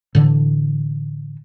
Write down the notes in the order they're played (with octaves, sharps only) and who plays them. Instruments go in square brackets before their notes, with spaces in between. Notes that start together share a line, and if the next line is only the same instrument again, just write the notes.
[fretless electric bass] A2 D3 E3